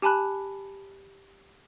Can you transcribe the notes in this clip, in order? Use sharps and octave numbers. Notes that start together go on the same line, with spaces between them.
G4 G#5 A5 B5 F#6